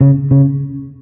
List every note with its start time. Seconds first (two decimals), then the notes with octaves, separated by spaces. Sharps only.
0.01 C#3
0.31 C#3